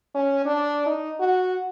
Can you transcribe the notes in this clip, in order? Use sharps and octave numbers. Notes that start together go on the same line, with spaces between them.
C#4
D4
D#4
F#4